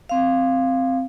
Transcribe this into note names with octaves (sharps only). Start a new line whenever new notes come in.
C4 F5